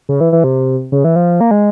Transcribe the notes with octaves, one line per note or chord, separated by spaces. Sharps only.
C#3
E3
E3
C3
C#3
E3
F3
A#3
G#3